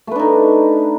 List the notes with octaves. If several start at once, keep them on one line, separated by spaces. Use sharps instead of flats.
A3 D4 D#4 B4